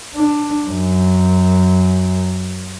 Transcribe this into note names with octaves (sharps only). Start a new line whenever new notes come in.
D4
F#2